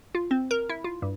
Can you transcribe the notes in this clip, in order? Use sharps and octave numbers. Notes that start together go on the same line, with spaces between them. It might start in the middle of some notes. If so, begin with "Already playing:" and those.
F4
C4
A#4
E4
F4
G2